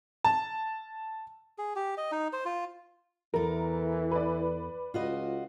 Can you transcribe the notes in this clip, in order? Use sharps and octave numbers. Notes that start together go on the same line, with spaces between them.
A5
G#4
G4
D#5
D#4
C5
F4
E2 E3 A4 A#4
B4 D5
C#2 F4 F#4 D#5